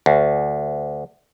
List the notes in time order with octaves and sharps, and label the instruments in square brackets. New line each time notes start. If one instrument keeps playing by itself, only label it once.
[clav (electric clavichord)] D2